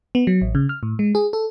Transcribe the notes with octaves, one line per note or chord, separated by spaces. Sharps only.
B3
F#3
A1
C#3
F6
A2
G#3
G#4
A4